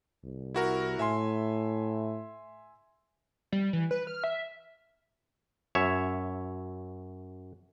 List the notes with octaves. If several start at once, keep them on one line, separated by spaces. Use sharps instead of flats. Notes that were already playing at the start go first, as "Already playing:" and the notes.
C2
E4 F#4 A#4
A2 E5 G#5 C6
G3
E3
B4
F6
E5
F#2 C#5 E5